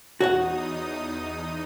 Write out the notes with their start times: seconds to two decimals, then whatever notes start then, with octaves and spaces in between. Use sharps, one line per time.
0.20 E2 D#4 F#4 C#5 F#5 D#6